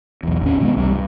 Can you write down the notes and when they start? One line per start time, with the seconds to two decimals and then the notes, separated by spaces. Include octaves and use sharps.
0.23 B1 E2
0.42 A1 D#2 C#4
0.60 B2 D#3 G#3 B3
0.77 C2 C3 D#3 G3
0.91 G2